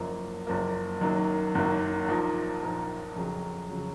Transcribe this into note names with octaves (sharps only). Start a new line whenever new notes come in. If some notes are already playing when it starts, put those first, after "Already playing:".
Already playing: F#1 F#2 F3 A#3
F#1 F#2 F3 A#3
F#1 F#2 D#3 F#3 A#3
F#1 F#2 D#3 F#3 A#3
A#1 A#2 F3 A#3 D#4
A#1 A#2 F3 A#3 D#4
F2 C#3 F#3
C#3 F#3